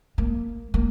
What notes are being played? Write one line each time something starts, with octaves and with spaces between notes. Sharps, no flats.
A#3
A#3